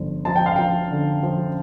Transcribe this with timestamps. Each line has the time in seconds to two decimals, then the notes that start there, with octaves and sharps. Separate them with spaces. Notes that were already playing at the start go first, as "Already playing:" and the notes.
Already playing: G1 F3
0.25 F3 A5
0.36 G5
0.46 F5
0.56 F3 G5
0.91 D3
1.23 F3